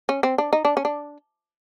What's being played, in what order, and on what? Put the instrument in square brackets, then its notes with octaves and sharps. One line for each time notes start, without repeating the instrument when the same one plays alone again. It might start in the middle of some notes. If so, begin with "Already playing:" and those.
[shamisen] C#4
C4
D4
D#4
D4
C#4
D4